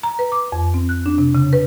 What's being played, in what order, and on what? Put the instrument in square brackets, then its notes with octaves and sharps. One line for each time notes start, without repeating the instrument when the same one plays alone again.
[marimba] A#5
B4
D6
F2
C4
F#6
D4
C3
C#3
B4